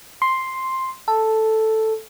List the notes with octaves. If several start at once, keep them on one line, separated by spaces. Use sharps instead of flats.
C6
A4